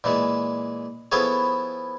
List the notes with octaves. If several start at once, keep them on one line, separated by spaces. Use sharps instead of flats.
A#2 E3 G#3
F3 B3 E4 G#4 A4 C#5